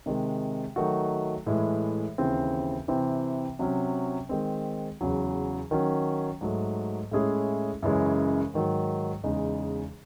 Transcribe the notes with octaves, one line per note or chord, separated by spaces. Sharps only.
C3 D#3 G#3
D#3 F#3 A3 D#4 F#4
A2 E3 G#3
D#2 C#3 E3 C4
C3 E3 C4
C3 F#3 C#4
D#3 G#3 C4
E2 C#3 F#3
D#3 F#3 C#4
G#2 F#3 A3
A2 G#3 C#4 E4 G#4
F#2 C#3 E3 G#3 C#4
G#2 D#3 F#3
E2 C#3 G#3 D#4